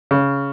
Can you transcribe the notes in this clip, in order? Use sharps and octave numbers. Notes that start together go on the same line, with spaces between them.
C#3